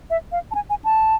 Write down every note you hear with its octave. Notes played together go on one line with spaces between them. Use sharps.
E5
F5
A5
G#5
G#5
A5